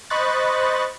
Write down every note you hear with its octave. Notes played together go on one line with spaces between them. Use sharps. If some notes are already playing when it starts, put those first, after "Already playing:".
C5 D#5 B5 C#6 F#6 A6